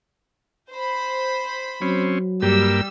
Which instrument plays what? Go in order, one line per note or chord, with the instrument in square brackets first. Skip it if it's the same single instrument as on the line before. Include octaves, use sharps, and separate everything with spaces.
[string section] C5 B5
[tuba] F#3 [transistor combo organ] C4 C#4
[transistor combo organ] G2 A#3 G4 [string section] G3 E6